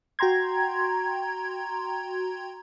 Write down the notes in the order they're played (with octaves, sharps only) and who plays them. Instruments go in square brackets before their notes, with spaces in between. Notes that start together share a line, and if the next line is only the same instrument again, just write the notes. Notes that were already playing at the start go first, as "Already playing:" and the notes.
[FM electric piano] F#4 G5 A#5 C6 G#6